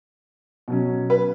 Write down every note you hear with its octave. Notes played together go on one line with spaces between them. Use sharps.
B2 F#3 C#4
B4